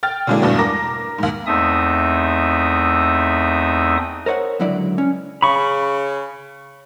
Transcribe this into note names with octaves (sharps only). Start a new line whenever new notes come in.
G5 F6 A6
D3 F#3 G#3 A#3 D4 E4
E2 G2 B2 A3 B3 D4
A#4 D6 A#6
D#2 G#2
E2 A3 C4 D#4 E5 D#6
A#4 C5 C#5 F5 F#5
C#2 D3 F#3 E4 D5
C#4
C#3 B5 C#6